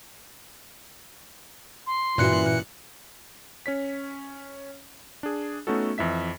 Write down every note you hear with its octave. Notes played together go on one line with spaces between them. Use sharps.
C6
G2 A#2 E3 C#4 F#4 F#6 C#7
C#4 C#5 B6
D4 G#4
A3 B3 C#4 D#4 F#4 A4
F2 E3 E5 B6